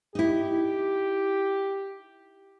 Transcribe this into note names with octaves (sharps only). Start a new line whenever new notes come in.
D#4 E4 G4